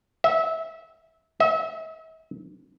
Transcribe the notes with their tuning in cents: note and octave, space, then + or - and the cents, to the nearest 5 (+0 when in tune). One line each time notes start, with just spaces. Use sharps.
E5 -25
E5 -45